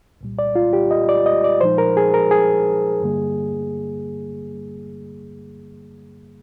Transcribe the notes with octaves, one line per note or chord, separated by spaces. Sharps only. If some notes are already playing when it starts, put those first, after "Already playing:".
C2 A#2 G3
D5
F4
G4
D#5
D5
D#5
D5
A#2 F3 G#3 D#4 C5
A#4
G#4
A#4
G#4
G2 D3 G3 A#3